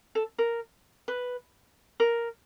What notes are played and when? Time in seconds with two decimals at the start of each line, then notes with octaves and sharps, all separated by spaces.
0.15 A4
0.38 A#4
1.08 B4
2.00 A#4